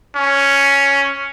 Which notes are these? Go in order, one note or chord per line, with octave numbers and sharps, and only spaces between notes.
C#4